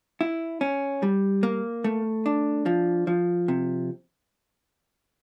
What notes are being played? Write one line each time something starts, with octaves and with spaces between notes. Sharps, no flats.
E4
C#4
G3
A#3
A3
D4
F3
F3
C3